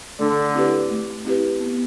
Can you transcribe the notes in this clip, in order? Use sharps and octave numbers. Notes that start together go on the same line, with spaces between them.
D3 A3
C4 E4 G4 B4
A3
C4 E4 G4 B4
B3